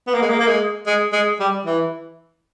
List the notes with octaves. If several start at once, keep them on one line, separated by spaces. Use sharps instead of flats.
B3
A#3
G#3
A#3
A#3
G#3
G#3
G#3
G3
E3